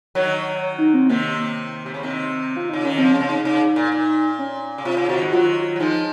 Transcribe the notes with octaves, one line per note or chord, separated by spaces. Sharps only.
D#3 F#3 C#5
D#4
C4
C3 D#3 A#3
C3
C#3
C3 D#3 C4
F4
C#3 D#4
D#3 C#4
C#3 F3 C4
C#4
C#3
D#4
C#3 D#4
A#2
A#2
C#4
C#3
C3 F4
C#3
C3 D#3 F#4
G#2
D#3 F#3 F4
F#3
F3 G#3 D#4